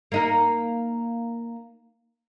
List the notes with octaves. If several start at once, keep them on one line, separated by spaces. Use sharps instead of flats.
A#3 D#4 A#4